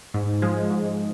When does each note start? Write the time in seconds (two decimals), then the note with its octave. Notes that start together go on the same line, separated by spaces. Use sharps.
0.14 G#2
0.42 F3 G#3
0.70 G#2